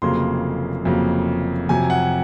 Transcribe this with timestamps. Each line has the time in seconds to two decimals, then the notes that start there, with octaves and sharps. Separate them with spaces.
0.02 F1 F2 C#3 F#3 A#3 C6
0.85 F1 F2 C#3 F#3 A#3
1.69 F2 C3 F#3 G#5
1.90 F#5